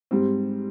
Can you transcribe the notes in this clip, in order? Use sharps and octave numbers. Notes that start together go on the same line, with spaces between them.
G#2 G3 C4